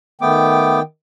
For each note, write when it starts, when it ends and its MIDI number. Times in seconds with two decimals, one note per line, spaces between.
0.21 0.82 51
0.21 0.80 57
0.21 0.80 59
0.21 0.82 79
0.21 0.80 86